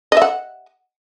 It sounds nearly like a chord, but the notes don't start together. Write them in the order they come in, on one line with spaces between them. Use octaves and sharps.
D#5 E5 F#5